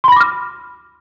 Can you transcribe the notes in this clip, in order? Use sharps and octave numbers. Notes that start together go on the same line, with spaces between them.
B5 C6 D6 F6 A#6